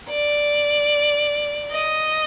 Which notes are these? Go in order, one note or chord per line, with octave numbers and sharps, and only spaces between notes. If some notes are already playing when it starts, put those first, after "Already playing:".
D5
D#5